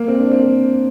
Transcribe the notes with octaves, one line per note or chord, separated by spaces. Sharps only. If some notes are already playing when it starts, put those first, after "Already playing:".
Already playing: A#3
C4
D4
C4